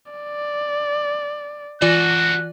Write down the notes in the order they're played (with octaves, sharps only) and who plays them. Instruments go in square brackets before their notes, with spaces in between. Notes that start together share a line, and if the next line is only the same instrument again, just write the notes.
[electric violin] D5
[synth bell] E3 F4 D5 [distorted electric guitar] F#4 A4 [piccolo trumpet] F#6